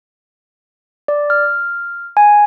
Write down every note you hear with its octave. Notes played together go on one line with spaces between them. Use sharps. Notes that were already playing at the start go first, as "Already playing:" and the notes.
D5
F6
G#5